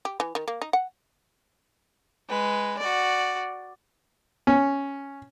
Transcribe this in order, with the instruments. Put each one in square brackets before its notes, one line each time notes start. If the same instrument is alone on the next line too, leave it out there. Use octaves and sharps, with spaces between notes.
[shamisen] G4
E3
D#3
A#3
D#4
F#5
[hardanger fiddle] G#3 B4
F#4 D5
[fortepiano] C#4